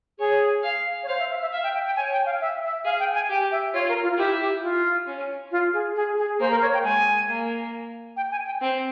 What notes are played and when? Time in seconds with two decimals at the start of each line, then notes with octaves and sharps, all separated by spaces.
0.19 G#4 C#5
0.64 F5
1.03 C#5
1.08 C5 F5
1.19 E5
1.30 E5
1.42 E5
1.52 E5 F5
1.64 G5
1.74 G5
1.86 G5
1.96 C#5 G#5
2.12 G5
2.26 F5
2.41 E5
2.64 E5
2.85 G#4 F5
3.00 G5
3.15 G#5
3.29 G4 G5
3.52 E5
3.74 F4 C#5
3.89 A#4
4.03 F4
4.18 E4 G4
4.40 G4
4.62 F4
5.07 C#4
5.52 F4
5.73 G#4
5.96 G#4
6.18 G#4
6.40 A#3 C5
6.51 A#4
6.62 C#5
6.74 G5
6.84 G#3 G#5
7.28 A#3
8.17 G5
8.31 G#5
8.46 G5
8.61 C4 G5